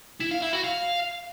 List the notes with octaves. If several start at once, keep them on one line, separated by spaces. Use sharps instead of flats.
E4
F5
E4
F#4
F5